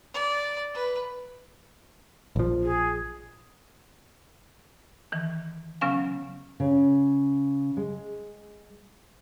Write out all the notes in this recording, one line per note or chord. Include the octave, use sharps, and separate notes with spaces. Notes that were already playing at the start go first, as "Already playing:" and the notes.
D5
B4
A#1 F3
G#4
D#3 E3
C#3 F#3 B3 C#4 F5 G#5
C#3
G#3